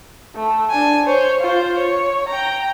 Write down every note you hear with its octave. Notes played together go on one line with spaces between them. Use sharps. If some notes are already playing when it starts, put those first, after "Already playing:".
A3
D4 G#5
C5 C#5
F4 C5
C#5
G5 A#5